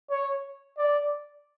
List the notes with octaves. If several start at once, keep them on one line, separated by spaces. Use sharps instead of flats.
C#5
D5